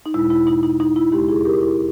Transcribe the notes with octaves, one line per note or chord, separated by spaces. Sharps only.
D#4
E2 B2 G#3 E4
E4
D#4
D#4
D#4
E4
D#2 C#3 G#3 D#4 G4
E4 G#4
G4 A#4
E4